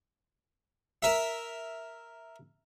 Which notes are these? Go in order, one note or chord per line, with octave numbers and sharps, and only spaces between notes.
A#4 E5